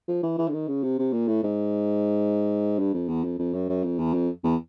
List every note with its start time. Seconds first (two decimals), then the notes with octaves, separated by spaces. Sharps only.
0.08 F3
0.23 E3
0.38 E3
0.48 D3
0.53 D#3
0.68 C#3
0.83 C3
0.99 C3
1.13 A#2
1.28 A2
1.43 G#2
2.79 G2
2.94 F2
3.09 E2
3.24 F2
3.39 F2
3.54 F#2
3.69 F#2
3.84 F2
3.99 E2
4.14 F2
4.44 E2